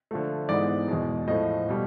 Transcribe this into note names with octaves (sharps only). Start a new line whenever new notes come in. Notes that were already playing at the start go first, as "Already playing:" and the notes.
D3 F3 A3
G#2 E3 G#3 B3 D5
E2 B2 G#3
A2 F3 A3 D#5
B2 G3